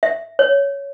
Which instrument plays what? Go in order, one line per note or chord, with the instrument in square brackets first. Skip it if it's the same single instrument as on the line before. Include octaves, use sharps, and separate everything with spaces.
[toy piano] E5
C#5